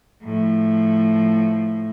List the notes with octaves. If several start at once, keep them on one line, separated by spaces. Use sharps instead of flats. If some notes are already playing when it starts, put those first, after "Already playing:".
A2 F3